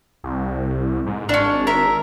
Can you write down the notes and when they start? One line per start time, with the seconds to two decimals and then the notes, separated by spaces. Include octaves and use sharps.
0.24 C2
1.06 G#2
1.29 G#1 C#4 D4
1.67 A#4 E5